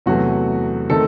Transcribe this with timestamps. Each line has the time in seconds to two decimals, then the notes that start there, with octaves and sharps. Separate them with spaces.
0.06 E2 C3 F#3 A3 F#4
0.90 D#3 A3 C4 A4